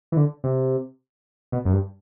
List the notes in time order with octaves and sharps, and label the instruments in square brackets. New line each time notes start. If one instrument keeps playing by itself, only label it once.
[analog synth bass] E3
D3
C3
B2
F#2
G2